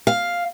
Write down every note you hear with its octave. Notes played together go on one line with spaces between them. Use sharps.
F5